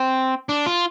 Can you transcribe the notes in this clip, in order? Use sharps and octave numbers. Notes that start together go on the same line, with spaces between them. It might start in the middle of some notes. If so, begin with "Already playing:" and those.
Already playing: C4
D4
F4